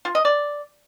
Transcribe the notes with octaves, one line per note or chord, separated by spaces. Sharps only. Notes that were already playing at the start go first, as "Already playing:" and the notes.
F4
D#5
D5